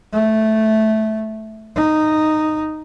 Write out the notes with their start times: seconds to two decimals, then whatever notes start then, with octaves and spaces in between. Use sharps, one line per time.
0.13 A3
1.75 D#4